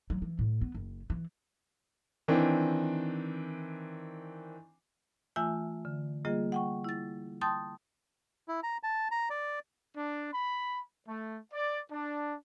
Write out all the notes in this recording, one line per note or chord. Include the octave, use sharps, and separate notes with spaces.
F#3
E3
A2
B3
F#1
E3
D#3 E3 C4 D4
E3 A3 F4 E5 G#5 E6
D3
G3 A#3 F4 G#4 D#5
F#5 G5 C#6
E4 A6
G5 A5 C6 D#6 G6 A6
E4
A#5
A5
A#5
D5
D4
B5
A3
D5
D4